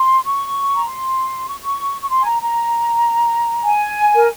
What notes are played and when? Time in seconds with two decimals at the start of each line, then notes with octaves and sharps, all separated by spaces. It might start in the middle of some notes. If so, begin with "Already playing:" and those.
Already playing: C6
0.24 C#6
0.75 A#5
0.86 C6
1.48 C#6
1.63 C#6
2.02 C#6
2.10 C6
2.20 G#5
2.25 A#5
2.41 A#5
3.64 G#5
4.15 A#4